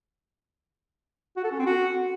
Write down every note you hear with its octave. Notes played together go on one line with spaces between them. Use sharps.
F#4
A4
C#4
C4
F#4